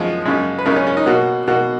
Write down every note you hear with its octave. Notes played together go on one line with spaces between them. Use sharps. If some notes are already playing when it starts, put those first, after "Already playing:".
Already playing: F#2 F3 G#3
F#2 C#3 G#3
B4
F#2 C#3 G#3 A#4
C#4
C#4
D#4
B2 A#3 F#4
B2 A#3 F#4